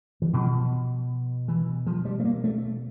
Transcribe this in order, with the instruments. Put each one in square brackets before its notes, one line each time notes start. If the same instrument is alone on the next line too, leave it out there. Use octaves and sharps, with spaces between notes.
[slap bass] E3
B2 F3
E3
F3
G3
A3
A#3
A3